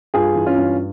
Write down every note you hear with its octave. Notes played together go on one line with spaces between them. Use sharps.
G2 F4 G#4
E3
C#4 F4
G2